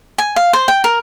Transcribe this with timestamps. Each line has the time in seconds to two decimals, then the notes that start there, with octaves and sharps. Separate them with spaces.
0.18 G#5
0.36 F5
0.53 C5
0.68 G5
0.84 A#4